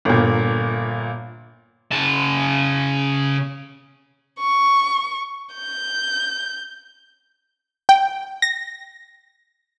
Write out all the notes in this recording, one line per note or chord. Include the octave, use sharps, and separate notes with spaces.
G1 A#2
C#3 A5
C#6
G6
G5
A#6